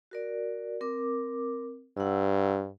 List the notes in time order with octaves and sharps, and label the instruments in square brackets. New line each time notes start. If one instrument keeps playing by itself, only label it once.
[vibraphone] F#4 A#4 D5
C4 A#4 D6
[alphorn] G2 [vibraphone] F#5 E6